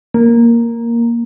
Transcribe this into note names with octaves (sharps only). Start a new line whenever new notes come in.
A#3